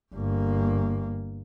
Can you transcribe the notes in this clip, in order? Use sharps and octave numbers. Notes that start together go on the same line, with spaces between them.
G1 A#3